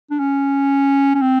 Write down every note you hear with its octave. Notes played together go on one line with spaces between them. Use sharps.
D4
C#4
C#4
C4